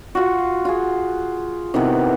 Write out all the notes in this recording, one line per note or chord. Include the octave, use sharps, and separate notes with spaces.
F4 F#4
F4 G#4
C3 D#3 E3 B3